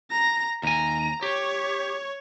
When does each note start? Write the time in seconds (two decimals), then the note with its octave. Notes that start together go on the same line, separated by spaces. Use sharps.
0.11 A#5 A#6
0.63 D#2 G#5 A#5
1.23 G4 C#5